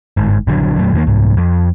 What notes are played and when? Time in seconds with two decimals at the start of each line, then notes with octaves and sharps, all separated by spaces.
0.17 G1 G#2
0.47 A#1 D3 F#3 D4
0.78 F2 A#2 F#3 A3
0.93 E2 D#3 A3 A#3
1.07 C2 G#2
1.37 F2